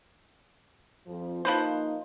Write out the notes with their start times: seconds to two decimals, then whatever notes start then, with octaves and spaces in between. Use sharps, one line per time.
1.07 F2 F3
1.45 F3 A#3 D#4 B4 C5